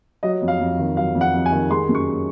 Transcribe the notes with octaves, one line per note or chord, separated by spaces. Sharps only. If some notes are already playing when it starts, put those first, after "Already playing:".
F#3 D#5
F2
F5
F2
D#3
F#3 F5
F2
F#5
F2
G#5
D#3
G#3 C6
F#2
C#6